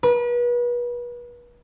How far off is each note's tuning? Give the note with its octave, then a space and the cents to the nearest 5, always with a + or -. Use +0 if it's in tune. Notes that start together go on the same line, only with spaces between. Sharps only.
B4 -35